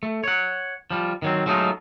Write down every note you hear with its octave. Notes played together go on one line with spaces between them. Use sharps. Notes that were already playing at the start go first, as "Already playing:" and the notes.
A3
C#5 F#5
F3 G3
D#3 F#3 C4
F#3 G#3 A3 C#4 D#4 F4